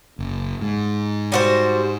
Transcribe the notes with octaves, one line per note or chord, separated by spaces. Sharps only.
F#1
G#2
G3 F#4 C5